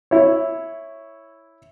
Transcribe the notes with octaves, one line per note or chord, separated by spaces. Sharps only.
E4 C#5